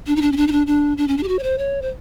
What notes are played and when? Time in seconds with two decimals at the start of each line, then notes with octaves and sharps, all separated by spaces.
0.07 D4
0.16 D#4
0.22 D4
0.32 C#4
0.37 D4
0.47 D#4
0.52 D4
0.67 D4
0.98 D4
1.08 C#4
1.17 D4
1.23 G4
1.28 F#4
1.39 C#5
1.43 C5
1.58 C#5
1.82 C5